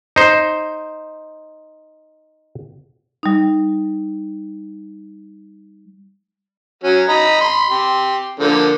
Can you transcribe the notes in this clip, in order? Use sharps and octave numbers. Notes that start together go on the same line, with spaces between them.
D#4 C5
G3 D#4
F#3 C#4 F#4
D#5 A#5 B5
B5 C6
G4 C6
D3 F3 A#3